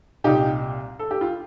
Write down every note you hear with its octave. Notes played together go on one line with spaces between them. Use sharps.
C2 A#2 D#4 G4
A4
G4
F4